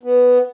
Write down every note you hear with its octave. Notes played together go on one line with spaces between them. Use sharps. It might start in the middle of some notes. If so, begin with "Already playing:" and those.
B3